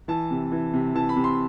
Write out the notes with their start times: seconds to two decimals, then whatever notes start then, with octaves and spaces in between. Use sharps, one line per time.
0.08 E3 A5
0.31 C3
0.52 E3
0.74 C3
0.95 E3 A5
1.09 B5
1.16 C3
1.24 C6